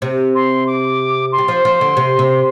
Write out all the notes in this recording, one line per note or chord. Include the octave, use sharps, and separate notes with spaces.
C3
C6
D6
C6
G3
F3
F3
D3
C3
C3